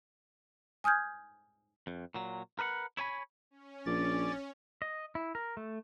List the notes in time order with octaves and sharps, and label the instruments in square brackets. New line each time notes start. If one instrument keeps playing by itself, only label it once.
[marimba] G#5 D#6 F6 G6 G#6
[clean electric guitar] F2
A#2 F#3
A#4 B4 D#5 F#5
E4 C#5 G#5 B5
[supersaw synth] C#4
[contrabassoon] A#1 [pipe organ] D5 A6
[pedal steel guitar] D#5
E4
A#4
A3